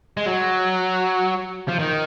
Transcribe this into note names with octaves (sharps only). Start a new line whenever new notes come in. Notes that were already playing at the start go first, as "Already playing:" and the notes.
G#3
F#3
F3
D#3